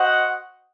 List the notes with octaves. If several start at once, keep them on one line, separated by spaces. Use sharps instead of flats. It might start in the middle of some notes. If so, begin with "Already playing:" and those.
Already playing: F#4 C5 D#5 F#5